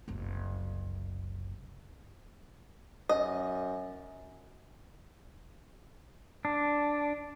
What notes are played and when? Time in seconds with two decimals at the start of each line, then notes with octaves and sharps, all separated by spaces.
0.08 F#1 C2
3.09 F#2 D#5
6.45 D4